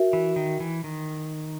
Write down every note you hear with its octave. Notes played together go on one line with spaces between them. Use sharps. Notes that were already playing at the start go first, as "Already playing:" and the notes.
Already playing: F#4 A#4 E5
E3
D#3
E3
D#3